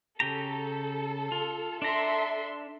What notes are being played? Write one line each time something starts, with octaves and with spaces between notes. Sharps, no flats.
C#3 G4 A4 A#5
F4
D4 A4 E5 A#5 C6